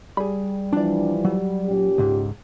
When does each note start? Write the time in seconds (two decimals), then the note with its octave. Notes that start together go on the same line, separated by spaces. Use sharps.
0.17 G3 G#4 B5
0.73 E3 F3 D4 D5
1.25 F#3
1.66 A#2 C#4 G4
1.98 C#2 G#2